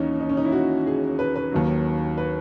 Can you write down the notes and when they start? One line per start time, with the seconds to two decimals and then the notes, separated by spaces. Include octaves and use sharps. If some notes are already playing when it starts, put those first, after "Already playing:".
Already playing: D#2 E3 C#4 D#4
0.20 D#4
0.29 C#4
0.37 D#4
0.45 E4
0.52 F#4
0.86 G#4
1.19 B4
1.36 B4
1.52 D#2 D#3 F#3
2.17 B4